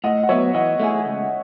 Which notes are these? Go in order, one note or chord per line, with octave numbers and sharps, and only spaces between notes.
A2 D#5 F#5
F#5
F#3 B3 C#5 E5
E3 D#5 F#5
A3 E4 G#4
C#2